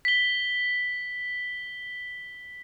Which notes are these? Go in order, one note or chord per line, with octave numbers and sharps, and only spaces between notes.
B6 G7